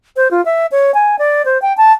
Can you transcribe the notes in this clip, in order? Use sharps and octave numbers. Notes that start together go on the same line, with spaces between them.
C5
F4
E5
C#5
G#5
D5
C5
G5
A5